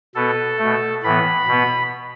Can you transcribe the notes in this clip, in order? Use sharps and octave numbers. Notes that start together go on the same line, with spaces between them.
B2 B3 A4
B2 A3
A2 E3 B3 B5
B2 B3